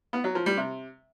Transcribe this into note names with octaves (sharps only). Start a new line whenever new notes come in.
B3
F#3
F3
G3
C3